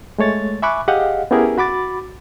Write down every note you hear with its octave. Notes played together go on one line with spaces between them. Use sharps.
G#3 A3 C#5 A6
E5 G#5 B5 C#6 D6 F#6
G4 G#4 D#5 F5 F#5
B3 C#4 E4 G4 G#4 A#4
F#4 B5 D6 A6